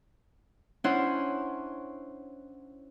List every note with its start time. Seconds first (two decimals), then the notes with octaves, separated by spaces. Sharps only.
0.84 C#4 D4 E4 C5 C#5 F#5